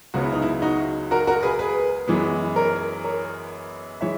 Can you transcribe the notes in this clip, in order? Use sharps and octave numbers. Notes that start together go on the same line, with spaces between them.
C#2 C#3 F#3 B3 F#4
E4
D#4
E4
D#4 F#4
F#4 A#4
F#4 A#4
G#4 B4
G#4 B4
F#2 E3 G#3 B3
A#4 C#5
A#4 C#5
E3 G#3 C#5 E5